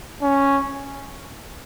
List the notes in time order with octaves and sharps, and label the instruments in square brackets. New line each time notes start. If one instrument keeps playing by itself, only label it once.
[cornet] C#4